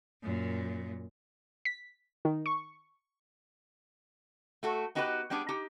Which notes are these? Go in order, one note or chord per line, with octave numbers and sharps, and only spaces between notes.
F#2 A#2
B6
D#3
C#6
A3 F#4 A4
B3 D#4 F#4 G4 A4 B4
G3 B3 D4 G4 G#4
D#4 G4